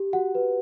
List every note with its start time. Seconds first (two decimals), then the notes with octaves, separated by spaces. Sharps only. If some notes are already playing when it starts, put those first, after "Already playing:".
Already playing: G4
0.13 F#4 F#5
0.35 B4